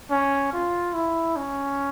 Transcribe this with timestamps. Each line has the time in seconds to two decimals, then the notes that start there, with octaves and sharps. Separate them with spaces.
0.10 C#4
0.53 F4
0.94 E4
1.36 C#4